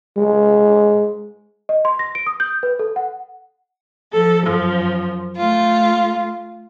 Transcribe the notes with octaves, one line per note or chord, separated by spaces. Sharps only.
G#3
D#5
C6
A#6
D7
D#6
G6
B4
A4
F#5
F3 A4
F#2 F3
A3 F4